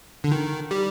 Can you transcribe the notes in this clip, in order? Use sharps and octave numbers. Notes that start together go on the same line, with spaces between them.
D3
D#3
G3